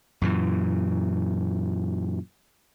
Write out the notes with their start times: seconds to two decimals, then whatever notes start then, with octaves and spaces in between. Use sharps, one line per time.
0.22 F#2 A#2 E3